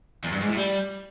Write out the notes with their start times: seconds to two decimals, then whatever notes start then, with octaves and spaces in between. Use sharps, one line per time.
0.24 E2
0.32 G2
0.40 G#2
0.49 A2
0.57 G3